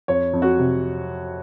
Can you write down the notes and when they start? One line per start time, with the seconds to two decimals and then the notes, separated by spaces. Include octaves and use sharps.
0.08 F2 C#5
0.33 F2
0.42 F#4
0.58 C3